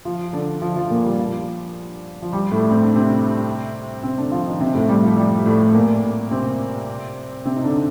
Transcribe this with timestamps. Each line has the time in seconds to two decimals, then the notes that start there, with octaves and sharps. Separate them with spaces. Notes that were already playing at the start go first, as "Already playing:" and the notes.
0.05 F3 F4
0.33 D3 D4
0.62 F3 F4
0.76 F3 F4
0.90 A#2 A#3
1.05 G3
1.19 F3
2.22 F3
2.33 G3
2.52 A2 A3
2.71 C4
2.83 D4
2.96 C3 C4
4.03 C3 C4
4.18 D3 D4
4.32 F3 F4
4.46 D#3 D#4
4.60 C3 C4
4.75 A2 A3
4.89 G3
5.03 F3
5.17 G3
5.46 A2 A3
5.74 A#2 A#3
6.31 C3 C4
7.45 C3 C4
7.57 D#4
7.64 D3 D4